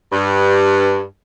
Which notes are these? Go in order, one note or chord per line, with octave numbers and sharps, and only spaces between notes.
G2